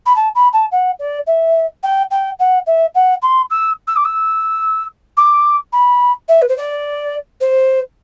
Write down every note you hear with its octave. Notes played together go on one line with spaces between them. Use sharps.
B5
A5
B5
A5
F#5
D5
E5
G5
G5
F#5
E5
F#5
C6
E6
E6
D6
E6
D6
B5
E5
B4
C5
D5
C5